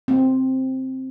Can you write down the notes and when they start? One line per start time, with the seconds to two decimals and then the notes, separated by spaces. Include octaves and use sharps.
0.08 C4